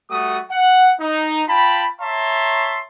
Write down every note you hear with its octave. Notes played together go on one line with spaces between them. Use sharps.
G3 A3 F#4 D#6
F#5
D#4
F4 G5 A5 B5
C#5 E5 A5 A#5 C6